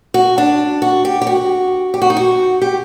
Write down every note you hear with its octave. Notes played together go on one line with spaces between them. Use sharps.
F#4
D4
F#4
G4
G4
F#4
G4
F#4
D#4
F#4
G4